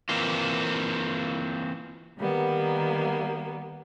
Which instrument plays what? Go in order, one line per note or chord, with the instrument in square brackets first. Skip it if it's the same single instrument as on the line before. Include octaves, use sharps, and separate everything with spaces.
[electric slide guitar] E3 A#3 C4 F4
[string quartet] D#3 G3 A#3 B3